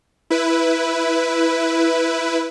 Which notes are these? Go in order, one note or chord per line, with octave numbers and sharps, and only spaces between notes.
E4 B4